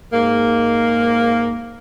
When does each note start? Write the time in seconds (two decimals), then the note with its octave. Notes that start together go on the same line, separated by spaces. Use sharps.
0.12 G#2 A#3